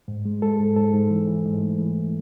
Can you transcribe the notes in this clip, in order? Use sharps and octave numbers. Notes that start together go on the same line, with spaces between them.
G#2
G#3
G#3 A4
G#2
G#2 A4
G#2
E3
E3
G#2
A3
E3